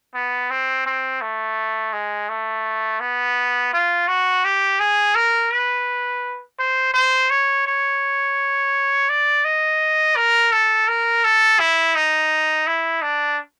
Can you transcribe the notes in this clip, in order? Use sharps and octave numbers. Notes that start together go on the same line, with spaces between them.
B3
C4
C4
A3
G#3
A3
B3
F4
F#4
G4
G#4
A#4
B4
C5
C5
C#5
C#5
D5
D#5
A#4
A4
A#4
A4
E4
D#4
E4
D4